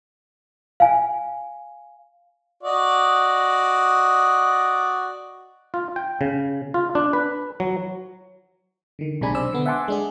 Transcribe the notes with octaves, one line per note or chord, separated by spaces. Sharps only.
F5 G#5
F#4 D5 D#5
F4
G5
C#3
F4
D4
B4
F#3
D3 D#3
B1 C3 G#3 D4 G#5 B5
C5 D5 E6
D3 B3
E5 F#5 G#5 A5 C6 D6
G#3 D4 G#4